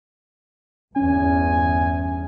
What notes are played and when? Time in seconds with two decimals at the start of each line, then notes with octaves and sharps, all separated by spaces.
0.96 G1 E2 C#4 G#5